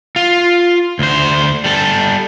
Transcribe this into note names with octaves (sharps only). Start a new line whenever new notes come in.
F4
D2 C5
G3 A4